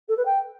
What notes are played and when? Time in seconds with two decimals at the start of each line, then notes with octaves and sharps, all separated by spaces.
0.08 A4
0.17 B4
0.25 G5